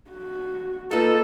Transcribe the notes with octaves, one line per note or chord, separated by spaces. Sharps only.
F#4
A#3 D#4 F4 A4 B4